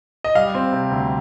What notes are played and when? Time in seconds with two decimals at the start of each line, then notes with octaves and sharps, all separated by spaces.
0.24 D#5
0.35 G3 F5
0.54 C4
0.72 C3
0.91 D2